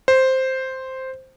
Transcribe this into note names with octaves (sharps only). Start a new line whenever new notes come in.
C5